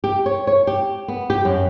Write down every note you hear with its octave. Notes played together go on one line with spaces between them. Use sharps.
G4
C#5
C#5
G4
B3
G4
F#2